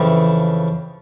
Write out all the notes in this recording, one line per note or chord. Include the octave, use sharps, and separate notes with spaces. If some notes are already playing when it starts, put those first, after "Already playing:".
Already playing: F2 C#3 E3